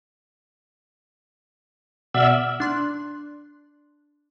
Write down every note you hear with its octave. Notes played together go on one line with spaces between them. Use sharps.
B2 D5 E5 F#5 E6 F6
D4 C6 F#6